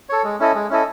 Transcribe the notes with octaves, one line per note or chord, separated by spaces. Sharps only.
A4 C#5
G#3
C#4 E4 A4 D#5
G#3
C#4 E4 A4 D#5